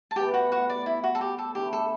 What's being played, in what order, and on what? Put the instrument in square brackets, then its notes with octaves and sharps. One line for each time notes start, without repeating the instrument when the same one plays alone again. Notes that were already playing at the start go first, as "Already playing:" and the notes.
[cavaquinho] A5
[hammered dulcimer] A2 G3 B3 [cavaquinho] G4 G5
[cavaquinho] F#4 F#5
F#4 F#5
D5
E4
F#4
A4
G4
A4
[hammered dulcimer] D3 A3 E4 [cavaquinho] G4
[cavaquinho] A4